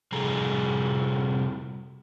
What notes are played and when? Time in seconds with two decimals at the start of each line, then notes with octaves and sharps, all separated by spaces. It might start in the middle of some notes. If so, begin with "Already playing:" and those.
0.12 C3 G3 G#4 A4 A#5